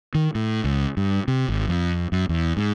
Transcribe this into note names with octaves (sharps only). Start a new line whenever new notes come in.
D#3
A2
C#2
G2
C3
G#1
F2
F#2
E2
G#2